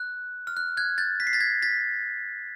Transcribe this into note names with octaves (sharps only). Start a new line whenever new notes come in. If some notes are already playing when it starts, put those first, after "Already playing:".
Already playing: F#6
F6
F#6
F#6 G#6
G6 A6
B6
C7
A6 B6
G#6 A#6
A6 B6